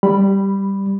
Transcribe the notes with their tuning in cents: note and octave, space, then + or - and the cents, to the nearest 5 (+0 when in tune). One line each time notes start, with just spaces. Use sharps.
G3 +0 B5 +0